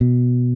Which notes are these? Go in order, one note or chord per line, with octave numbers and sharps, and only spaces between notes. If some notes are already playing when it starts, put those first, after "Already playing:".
B2